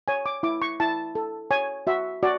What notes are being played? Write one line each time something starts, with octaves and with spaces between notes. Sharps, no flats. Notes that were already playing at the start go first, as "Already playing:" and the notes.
C#5 G#5
D6
E4 D6
C#6
E4 A5
A4
C#5 G#5
F#4 E5
F#4 D5